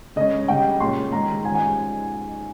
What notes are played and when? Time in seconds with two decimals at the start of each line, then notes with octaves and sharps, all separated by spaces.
0.16 C#3 G#3 C#4 D#5
0.48 C#3 G3 C#4 G5
0.80 A#2 G#3 C#4 C6
1.12 D#3 G#3 D#4 A#5
1.45 F3 G#3 C#4 G#5
1.55 G#5